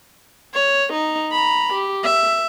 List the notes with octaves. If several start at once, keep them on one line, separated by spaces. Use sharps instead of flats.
C#5
D#4
A#5 B5
G4
E5